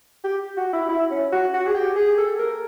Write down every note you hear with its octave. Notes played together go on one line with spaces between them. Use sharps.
G4
F#4
E4
E4
C#4
F#4
F#4
G#4
G4
G#4
A4
A#4